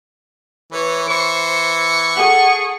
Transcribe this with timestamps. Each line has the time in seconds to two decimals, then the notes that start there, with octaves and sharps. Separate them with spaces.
0.72 E3 B4 C#5
1.09 E3 C5 C#6
2.16 G#4 A4 F#5